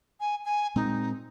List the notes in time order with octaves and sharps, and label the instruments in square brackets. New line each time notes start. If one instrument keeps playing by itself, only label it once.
[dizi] G#5
G#5
[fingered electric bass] A#2 G#3 C4 [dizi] D#4